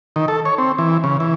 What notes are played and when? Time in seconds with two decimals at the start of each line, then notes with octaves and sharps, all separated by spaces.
0.16 D#3
0.28 A4
0.45 C#5
0.58 C4
0.78 E3
1.04 C#3
1.20 E3